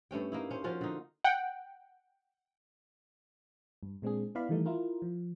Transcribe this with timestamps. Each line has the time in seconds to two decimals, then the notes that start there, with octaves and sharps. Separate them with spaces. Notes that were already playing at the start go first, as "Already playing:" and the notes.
0.11 G2 A3 C#4 G5
0.32 A#3 D#4 E4
0.51 C#4 C5
0.64 F3 C#4 F4 F#4
0.81 D3 D#4
1.24 F#5 G5
3.83 G2
4.02 A#2 G#3 C4 D4 G#4
4.35 B3 E4 D5 F5 B5
4.49 D#3 E3 G3 A3 D#4
4.66 E4 F4 A#4
5.02 F3